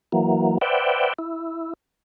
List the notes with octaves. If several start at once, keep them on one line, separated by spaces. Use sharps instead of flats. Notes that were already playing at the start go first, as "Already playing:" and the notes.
E3 F#3 A#3
B4 C5 D5 E5 F#5 G5
E4